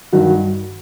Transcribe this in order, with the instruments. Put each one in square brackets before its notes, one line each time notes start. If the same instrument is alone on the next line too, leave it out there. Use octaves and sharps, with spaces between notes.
[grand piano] G2 D#3 F#3 F#4